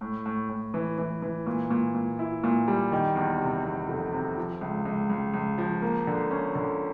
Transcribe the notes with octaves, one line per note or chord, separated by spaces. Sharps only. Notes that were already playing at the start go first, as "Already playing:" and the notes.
A2
A2
A2
E3
E3
E3
A#2
A#2
A#2
E4
A#2
G3
D#3
E2
C3
E2
F1
C3
F3
C#2
C#2
C#2
C#2
F3
A#3
D3
C#4
D3